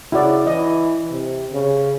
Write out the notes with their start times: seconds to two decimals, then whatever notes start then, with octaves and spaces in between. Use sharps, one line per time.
0.12 C#3 E4 F#4 D5
0.47 E3 D#5
1.11 C3
1.52 C#3